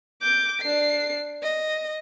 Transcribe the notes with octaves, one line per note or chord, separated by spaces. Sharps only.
D6 G6
D4 C7
D#5